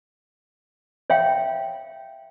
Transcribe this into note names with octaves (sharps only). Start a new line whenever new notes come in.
C#5 E5 F5 G5